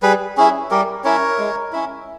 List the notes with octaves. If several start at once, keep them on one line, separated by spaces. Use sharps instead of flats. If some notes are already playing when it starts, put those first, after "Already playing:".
G3 G#4 B4
C#4 E4 G#4
G3 G4 A#4
C#4 E4 A#4 C#5
G#3
C#4 E4